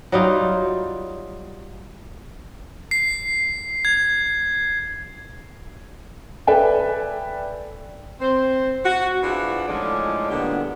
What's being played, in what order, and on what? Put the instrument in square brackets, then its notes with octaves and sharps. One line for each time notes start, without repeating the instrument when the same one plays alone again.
[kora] F#3 G3 D#4 F4
[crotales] C7
G#6
[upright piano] A4 B4 D5 E5 G5 G#5
[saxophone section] C4 C5
F#4
E2 E3 F3 D4 F4 F#5
A2 F3 G#3 C#4 D#4 D5
A#2 D3 G3 G#3 B3 G4